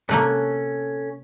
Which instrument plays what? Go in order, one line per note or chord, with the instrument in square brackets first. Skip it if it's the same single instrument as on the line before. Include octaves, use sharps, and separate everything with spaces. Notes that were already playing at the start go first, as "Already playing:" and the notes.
[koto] C3 A3 A#3 [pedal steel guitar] C#4 A4 F#6